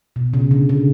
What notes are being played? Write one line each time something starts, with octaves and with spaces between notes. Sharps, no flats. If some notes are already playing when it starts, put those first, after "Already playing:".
B2
C#3
D3
C#3